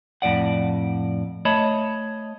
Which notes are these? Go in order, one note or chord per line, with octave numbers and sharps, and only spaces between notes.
F2 A2 D5 F#5
A3 C#5 D#5 A5 B5